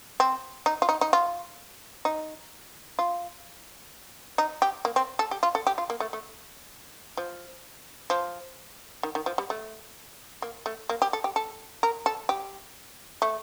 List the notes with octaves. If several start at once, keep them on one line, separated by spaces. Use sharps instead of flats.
C4
D#4
F4
D#4
D#4
F4
D#4
F4
D#4
G4
A#3
C4
A4
G4
F4
A4
G4
F4
A#3
A3
A3
F3
F3
D#3
D#3
F3
G3
A3
A#3
A3
A#3
G4
A4
G4
A4
A#4
A4
G4
A3